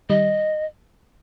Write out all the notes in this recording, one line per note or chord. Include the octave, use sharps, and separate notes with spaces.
D#3 G3 D#5